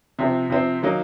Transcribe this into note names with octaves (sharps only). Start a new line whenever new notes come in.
C3 F3 C4
C3 F3 C4
D#3 F#3 A#3 D#4